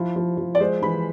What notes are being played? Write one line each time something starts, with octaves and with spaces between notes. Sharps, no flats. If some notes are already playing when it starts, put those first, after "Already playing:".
Already playing: F3 E4
F3
F3
D5
G#3 C5
E3 B5